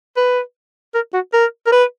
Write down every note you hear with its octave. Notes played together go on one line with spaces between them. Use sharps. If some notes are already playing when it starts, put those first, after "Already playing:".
B4
A#4
F#4
A#4
A#4
B4